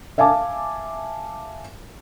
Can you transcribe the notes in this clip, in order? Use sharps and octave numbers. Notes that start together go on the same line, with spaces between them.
E5 F5 G#5 A5 D6